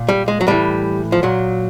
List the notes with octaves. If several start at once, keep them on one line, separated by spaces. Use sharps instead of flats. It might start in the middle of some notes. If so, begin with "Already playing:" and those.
Already playing: A#2
G3
G#3
F#3
A2 E3 G3
F3
A#2 F#3